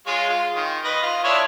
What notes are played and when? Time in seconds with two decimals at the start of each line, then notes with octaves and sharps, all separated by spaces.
0.07 G#3 F4 C#5
0.30 F4
0.56 D#3
0.85 B4 D#5
1.03 F4
1.24 D4 E4 C#5